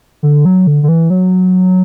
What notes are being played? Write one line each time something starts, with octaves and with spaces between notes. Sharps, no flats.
D3
F#3
D3
D3
E3
F#3